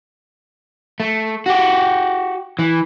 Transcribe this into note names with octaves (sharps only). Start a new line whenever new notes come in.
A3
F#4 G4
E3